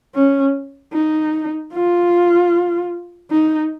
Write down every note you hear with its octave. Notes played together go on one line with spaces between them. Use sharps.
C#4
D#4
F4
D#4